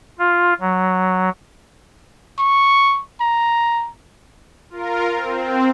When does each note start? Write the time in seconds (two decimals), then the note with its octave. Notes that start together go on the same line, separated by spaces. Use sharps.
0.19 F4
0.60 F#3
2.39 C#6
3.21 A#5
4.70 F4 A#4
5.15 C4